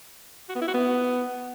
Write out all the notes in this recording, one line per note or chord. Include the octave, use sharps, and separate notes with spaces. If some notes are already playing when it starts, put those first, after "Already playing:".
F#4
B3
E4
F#4
B3